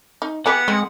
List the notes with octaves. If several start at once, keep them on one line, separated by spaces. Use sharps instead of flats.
D#4
B3 E4 G4 G#4 F#5
G#3 C4